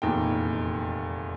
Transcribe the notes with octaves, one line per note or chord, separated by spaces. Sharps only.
F1 E2 A#2 D#3 G5